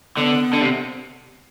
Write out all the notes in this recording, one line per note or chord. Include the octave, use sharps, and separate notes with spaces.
D3 B3
D3
C3